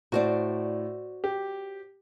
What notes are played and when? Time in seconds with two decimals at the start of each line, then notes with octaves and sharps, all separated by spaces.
0.12 A2 F#4 C5 D5
1.24 G4